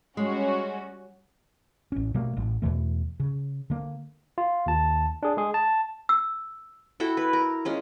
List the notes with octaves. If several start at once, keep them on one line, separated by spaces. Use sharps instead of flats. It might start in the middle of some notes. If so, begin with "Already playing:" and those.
G3 G#3 C#4 F#4
A1 C#4
B2 G3 A3 A#3
A1
E2 B2 E3 A3
C#3
D3 A#3
F4
D#2 A5
D4 G#4
G#3 G#4
A5
E6
E4 F#4 A4 G5
B4
A#4
G#3 C#4 F4